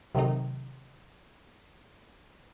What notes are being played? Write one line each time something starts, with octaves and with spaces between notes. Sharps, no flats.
C3 D#3 F#3 A3 C4 D#4